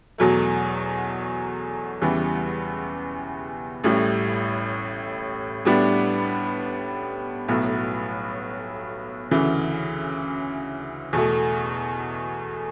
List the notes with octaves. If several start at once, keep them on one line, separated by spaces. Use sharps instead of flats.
E2 B2 F#3 A3
E2 C#3 E3 G3 B3
A1 A2 G3
A2 G3 B3 D4
B1 A2 F#3 B3
D2 C#3 E3
E2 B2 A3